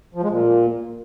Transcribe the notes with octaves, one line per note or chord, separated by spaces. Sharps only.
F3
G#3
A#2